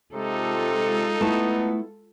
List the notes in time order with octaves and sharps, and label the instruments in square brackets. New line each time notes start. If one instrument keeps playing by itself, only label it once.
[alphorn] C3 [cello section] G#3 F4 A4 [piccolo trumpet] D#4
[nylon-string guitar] A3 E4 A5 [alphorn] B3